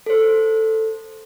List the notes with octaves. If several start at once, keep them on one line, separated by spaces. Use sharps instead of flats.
A4 C5